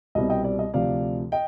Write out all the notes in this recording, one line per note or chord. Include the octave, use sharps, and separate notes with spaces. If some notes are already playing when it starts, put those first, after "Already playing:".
C2 B2 G3 C4 D#5
D#5 G5
D5
D#5
D2 C3 F3 D5 F5
D#5 G5